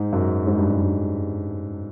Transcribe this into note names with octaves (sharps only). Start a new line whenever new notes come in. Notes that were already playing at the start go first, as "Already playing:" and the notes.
Already playing: G#2
F#2
G#2
G2
F#2
G2